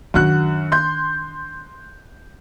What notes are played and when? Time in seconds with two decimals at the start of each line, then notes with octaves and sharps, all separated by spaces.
0.14 F#2 D#3 D4 F#4 F#6
0.72 C6 G6